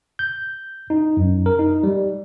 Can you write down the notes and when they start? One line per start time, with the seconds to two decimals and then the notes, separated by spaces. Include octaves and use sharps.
0.19 G6
0.90 D#4
1.17 F#2
1.46 A#4
1.59 D#4
1.83 G3